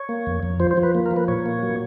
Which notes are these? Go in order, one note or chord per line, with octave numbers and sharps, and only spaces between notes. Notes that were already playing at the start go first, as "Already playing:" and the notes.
Already playing: C#5
A#3
F2
F2
F3 C5
C5
F3
B4
A#3
A#4
F3
B4
A#2 C#5
A#3
F#3